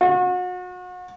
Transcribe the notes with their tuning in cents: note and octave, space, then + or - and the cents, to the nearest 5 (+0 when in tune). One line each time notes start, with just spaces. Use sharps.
F#4 -35